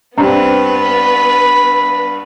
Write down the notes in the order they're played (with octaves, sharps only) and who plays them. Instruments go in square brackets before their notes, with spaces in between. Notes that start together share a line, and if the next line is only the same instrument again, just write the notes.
[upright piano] G2 [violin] B3 B4 [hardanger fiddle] C4
[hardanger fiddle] B5